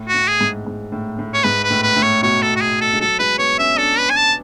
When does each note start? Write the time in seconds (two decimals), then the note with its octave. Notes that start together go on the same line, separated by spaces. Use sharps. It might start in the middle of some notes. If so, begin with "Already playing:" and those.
Already playing: A2
0.09 F#4
0.14 A2
0.28 G#4
0.41 G#2
0.67 G#2
0.92 A2
1.19 A2
1.34 C#5
1.44 G#2 B4
1.63 B4
1.70 A2
1.83 B4
1.96 A2
2.02 C#5
2.22 B2 C#5
2.42 A4
2.56 F#4
2.61 G#4
2.81 A4
2.94 G#3
3.00 F#3 A4
3.19 G#3 B4
3.39 B3 C#5
3.59 C#4 E5
3.78 D4 A4
3.98 B4
4.10 G#5
4.17 A5